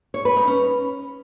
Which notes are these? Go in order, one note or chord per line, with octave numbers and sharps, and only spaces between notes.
C#5
B4
D#4
C#4